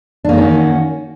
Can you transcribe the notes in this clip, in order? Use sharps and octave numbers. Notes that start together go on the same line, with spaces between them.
D#3 A#3 C#4 D4 F#4